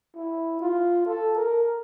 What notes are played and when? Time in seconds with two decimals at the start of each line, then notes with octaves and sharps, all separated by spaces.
0.16 E4
0.61 F4
1.06 A4
1.37 A#4